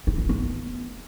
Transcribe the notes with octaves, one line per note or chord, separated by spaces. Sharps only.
E4
F4
B3